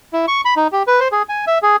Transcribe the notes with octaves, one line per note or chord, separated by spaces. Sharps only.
E4
C#6
B5
D#4
G4
B4
C5
G#4
G#5
E5
G#4